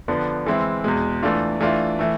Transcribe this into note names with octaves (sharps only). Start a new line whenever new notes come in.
D3 F3 B3 D4
E3 G#3 C4 E4
E2 B2 G#3
E3 A3 D4 F4
E3 A3 D4 F4
E3 A3